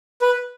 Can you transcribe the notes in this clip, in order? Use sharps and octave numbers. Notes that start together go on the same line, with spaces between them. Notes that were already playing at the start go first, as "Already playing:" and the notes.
B4